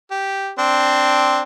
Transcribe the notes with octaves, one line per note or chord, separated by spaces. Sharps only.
G4
C4 D4